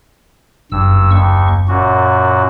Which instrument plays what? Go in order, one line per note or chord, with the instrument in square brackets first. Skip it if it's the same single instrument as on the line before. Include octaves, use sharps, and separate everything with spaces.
[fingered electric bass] F#1 [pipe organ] G2 E6
[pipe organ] D#2 C#6
F#2 A#2 F#4